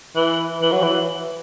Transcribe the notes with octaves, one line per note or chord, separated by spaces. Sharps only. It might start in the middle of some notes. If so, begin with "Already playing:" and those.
E3
E3
F#3
E3